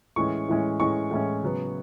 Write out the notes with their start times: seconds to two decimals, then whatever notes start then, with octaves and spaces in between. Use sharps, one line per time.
0.16 A2 E3 G#3 C#4 C#6
0.48 A2 E3 G#3 C#4
0.80 A2 E3 G#3 C#4 C#6
1.11 A2 E3 G#3 C#4
1.43 C#3 F#3 B3